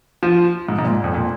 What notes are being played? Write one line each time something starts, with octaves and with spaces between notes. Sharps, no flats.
F3
G#2
G#2
A#2
F2
A#2